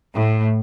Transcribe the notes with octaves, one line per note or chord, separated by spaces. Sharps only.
A2